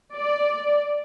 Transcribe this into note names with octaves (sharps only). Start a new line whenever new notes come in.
D5